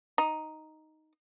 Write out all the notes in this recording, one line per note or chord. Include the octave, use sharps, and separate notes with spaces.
D#4